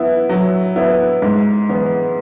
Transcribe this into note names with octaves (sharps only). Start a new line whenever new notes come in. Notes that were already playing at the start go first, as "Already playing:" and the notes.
Already playing: B3 E4
F#3
B3 E4
G#2
E3 B3